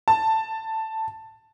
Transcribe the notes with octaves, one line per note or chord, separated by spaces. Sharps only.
A5